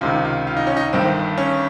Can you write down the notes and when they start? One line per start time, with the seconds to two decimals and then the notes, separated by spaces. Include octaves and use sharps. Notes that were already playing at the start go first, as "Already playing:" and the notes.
0.01 C#2 C3 D#3 F4
0.25 F4
0.47 F4
0.57 D#4
0.67 C#4
0.77 D#4
0.93 G1 G2 D#3 C4
1.38 C#4